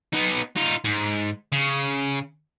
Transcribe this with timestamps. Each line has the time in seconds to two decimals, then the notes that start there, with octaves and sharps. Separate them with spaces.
0.13 B3 D#4
0.56 D#4 F4
0.85 G#2
1.52 C#3